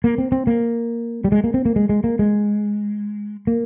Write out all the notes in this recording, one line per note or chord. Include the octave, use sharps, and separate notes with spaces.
A#3
C4
C4
A#3
G3
G#3
A#3
C4
A#3
G#3
G#3
A#3
G#3
A#3